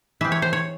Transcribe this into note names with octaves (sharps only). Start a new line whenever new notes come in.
E3 G#3 C4 E5
C#5
C5
C#5